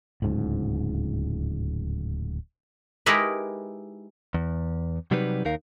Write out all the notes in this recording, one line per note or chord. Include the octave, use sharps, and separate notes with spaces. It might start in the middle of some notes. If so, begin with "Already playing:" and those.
D1 C#2 G#2
G#3 D#4 E4 G4 A#4 B4
E2
C3 F#3 G3 D#4 B4
D#2 D#4 A#4 F5